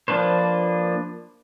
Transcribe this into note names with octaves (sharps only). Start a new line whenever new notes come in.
F3 A#3 D4 B4 C5